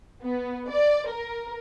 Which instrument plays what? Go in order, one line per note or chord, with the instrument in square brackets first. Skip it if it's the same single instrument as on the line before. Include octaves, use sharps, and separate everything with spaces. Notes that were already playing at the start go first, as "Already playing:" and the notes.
[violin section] B3
D5
A#4